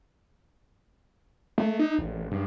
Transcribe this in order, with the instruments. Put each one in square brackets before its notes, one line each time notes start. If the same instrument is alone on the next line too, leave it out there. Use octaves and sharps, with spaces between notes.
[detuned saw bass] A3
D#4
A1
G2